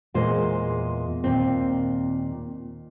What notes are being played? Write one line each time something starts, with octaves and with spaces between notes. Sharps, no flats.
E2 A#2 G#3 C5
D#2 A#2 C4